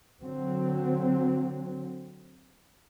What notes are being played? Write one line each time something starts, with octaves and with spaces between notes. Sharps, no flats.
D3 F#3 C4